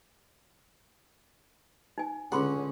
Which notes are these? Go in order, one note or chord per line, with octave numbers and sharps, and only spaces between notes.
D#4 G#5
C#2 D3 C#4 G#4 F#5 B5 C6